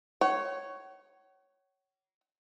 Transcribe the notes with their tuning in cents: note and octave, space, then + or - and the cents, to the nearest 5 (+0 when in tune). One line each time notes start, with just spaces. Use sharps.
C#5 +0 F#5 +45